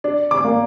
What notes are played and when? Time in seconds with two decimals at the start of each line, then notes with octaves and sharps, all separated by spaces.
0.04 D4
0.31 D6
0.44 A#3